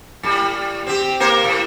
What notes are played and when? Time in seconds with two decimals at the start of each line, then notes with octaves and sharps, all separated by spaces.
0.23 A2 G3
0.87 C4 G4
1.20 A#3 A#4 C5
1.44 A2